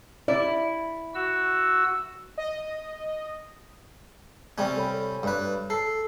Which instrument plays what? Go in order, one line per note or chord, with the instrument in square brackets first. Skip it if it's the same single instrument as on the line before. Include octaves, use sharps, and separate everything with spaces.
[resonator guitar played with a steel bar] E4 [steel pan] D5
[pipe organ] F#4 E6
[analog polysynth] D#5
[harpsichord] C3 G3 C#4 [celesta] G#5
[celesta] A4 C#5 B5
[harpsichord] G2 B4
[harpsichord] A4 [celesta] C7